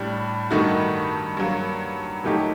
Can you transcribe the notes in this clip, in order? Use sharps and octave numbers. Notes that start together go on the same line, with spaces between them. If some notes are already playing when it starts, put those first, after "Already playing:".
Already playing: A2 G3 D4
G2 D#3 A3 D#4 F#4
G2 F#3 A#3
A#2 F#3 A3 D#4 G4